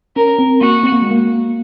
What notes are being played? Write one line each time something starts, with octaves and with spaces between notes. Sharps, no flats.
C#4 A#4
C4
A#3 F#4
C4
A#3
G#3
A#3